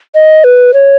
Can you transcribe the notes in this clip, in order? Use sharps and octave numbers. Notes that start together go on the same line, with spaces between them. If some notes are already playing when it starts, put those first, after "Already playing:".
D#5
B4
C#5